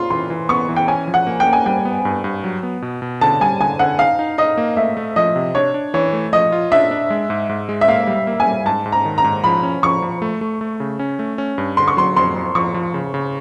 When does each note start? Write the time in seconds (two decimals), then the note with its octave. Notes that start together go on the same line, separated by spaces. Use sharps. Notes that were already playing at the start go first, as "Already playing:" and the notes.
Already playing: F4 C6
0.10 E3 C6
0.30 E3
0.49 B3 C#6
0.68 E3
0.76 G5
0.88 C#4 G#5
1.07 F3
1.14 F#5
1.27 A#3
1.40 G5
1.46 A#3
1.53 G#5
1.66 G3 G5
1.85 B3
2.05 G2
2.24 G2
2.44 F#3
2.63 B3
2.82 B2
3.02 B2
3.21 D3 A5
3.41 G3 G#5
3.60 D3 G#5
3.79 D3 F#5
3.99 D#4 F5
4.19 D#4
4.38 D#4 D#5
4.58 A#3
4.77 A3 E5
4.97 A3
5.16 F3 D#5
5.36 C3
5.54 D4 C#5
5.74 D4
5.94 E3 C#5
6.13 A3
6.33 F3 D#5
6.52 F4
6.72 D4 E5
6.91 D4
7.10 G#3
7.30 G#2
7.49 G#2
7.69 G#3
7.81 E5
7.88 A#3 F5
8.07 G3
8.27 A#3
8.40 G#5
8.47 G3
8.65 G#2 A5
8.86 G#2
8.92 A#5
9.05 D#3
9.18 A#5
9.24 G#2
9.44 F3 B5
9.63 C#4
9.83 F3 C#6
10.02 F3
10.22 A3
10.41 A3
10.61 A3
10.80 C#3
10.99 C#4
11.19 A3
11.38 C#4
11.58 G2
11.77 D3 C6
11.88 C#6
11.97 F#3 C6
12.16 F2 C6
12.36 F2
12.55 F3 C#6
12.74 F3
12.94 C#3
13.14 C#3